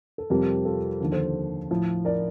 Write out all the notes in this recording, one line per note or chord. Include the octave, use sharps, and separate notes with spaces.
A4
F2 C3 G3 G4 A#4
F4 A4
D#2 D3 F3
A4 C5
A2 F3
A#4 D5